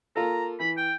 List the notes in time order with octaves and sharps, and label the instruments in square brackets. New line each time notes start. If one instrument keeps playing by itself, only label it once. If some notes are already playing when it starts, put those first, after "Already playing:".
[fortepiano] A#3 F4 A4 [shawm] A#5
[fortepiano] E3 [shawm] B5
[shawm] G5